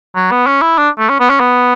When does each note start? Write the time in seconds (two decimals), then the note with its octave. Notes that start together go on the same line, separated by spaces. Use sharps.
0.15 F#3
0.31 B3
0.47 C#4
0.62 E4
0.78 D4
0.99 A3
1.10 C#4
1.20 B3
1.30 C#4
1.40 B3